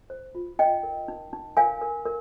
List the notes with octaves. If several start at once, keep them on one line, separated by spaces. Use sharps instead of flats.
C5
F4
D#4 D#5 G5
A#4
D#4
D#4
A#4 F5 G#5
A#4
A#4